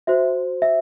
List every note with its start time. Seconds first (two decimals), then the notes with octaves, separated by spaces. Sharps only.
0.07 F#4 C5 E5
0.62 E5